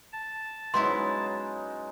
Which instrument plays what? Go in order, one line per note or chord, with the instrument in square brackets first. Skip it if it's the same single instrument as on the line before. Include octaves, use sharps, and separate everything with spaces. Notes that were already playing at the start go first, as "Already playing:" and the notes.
[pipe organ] A5
[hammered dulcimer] F#3 G#3 D#4 [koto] B3 C#4 E4 [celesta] C6